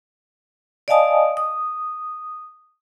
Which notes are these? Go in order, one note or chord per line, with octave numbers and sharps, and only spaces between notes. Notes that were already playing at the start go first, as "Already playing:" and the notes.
D5 D#5 F5 G#5 A5 D#6
D#6